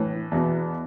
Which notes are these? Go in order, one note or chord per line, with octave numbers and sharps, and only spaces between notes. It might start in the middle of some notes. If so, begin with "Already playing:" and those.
Already playing: A2 E3
E2 B2